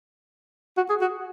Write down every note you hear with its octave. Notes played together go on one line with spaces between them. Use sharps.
F#4
G#4
F#4